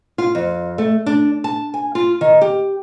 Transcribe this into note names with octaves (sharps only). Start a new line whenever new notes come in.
F4
F2
A3
D4
A5
G#5
F4
D#3
G4